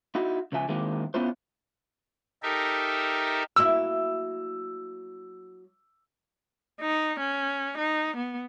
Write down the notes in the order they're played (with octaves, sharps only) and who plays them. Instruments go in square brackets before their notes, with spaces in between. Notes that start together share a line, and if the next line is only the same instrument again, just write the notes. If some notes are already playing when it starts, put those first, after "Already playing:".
[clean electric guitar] D#4 E4 F#4
C#2 C#3 F3 E5 G#5
D#3 G#3 A#3 C4 E4 G4
B3 C#4 E4 F4 C5
[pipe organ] D#4 G4 A4 A#4 E5
[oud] F#3 A#3 E4 [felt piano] E6
[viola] D#4
C#4
D#4
B3